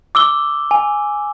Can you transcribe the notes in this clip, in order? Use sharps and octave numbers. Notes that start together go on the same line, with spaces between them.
D6 E6 G7
G#5